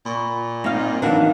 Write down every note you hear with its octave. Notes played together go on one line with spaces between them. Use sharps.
A#2 B5 C#6
A3 C4 D#4 F5
D#3 E3 F#3 D4 A#4 F5 F#5